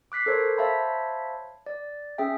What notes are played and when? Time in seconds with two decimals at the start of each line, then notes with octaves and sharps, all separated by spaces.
0.12 D6 F#6 B6 C7
0.26 A4 A#4 C5 C#5
0.58 C5 C#5 E5 F5 A5 B5
1.66 D5
2.18 C#4 G#4 E5 G5